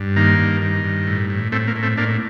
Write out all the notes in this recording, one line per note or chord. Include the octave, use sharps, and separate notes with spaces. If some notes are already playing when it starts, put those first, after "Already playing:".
Already playing: G2
D#3 A#3
G2
D#3
G2
A2
A2
A2 A3 C4
A#3
A2
A3 C4
A2 A#3 D4